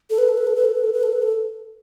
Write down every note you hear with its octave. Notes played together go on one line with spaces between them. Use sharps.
A4
B4
A4
B4
A4
B4
A4
B4
A4
B4
A4
B4
A4